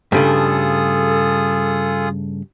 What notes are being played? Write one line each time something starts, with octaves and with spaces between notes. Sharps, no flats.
G2 C#3 A3 F4 G#4 A4 D#6